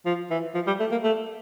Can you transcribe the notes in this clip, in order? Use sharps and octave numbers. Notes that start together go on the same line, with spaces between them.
F3
E3
F3
G3
A3
A#3
A3